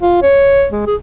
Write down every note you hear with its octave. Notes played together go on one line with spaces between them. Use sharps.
F4
C#5
G#3
G#4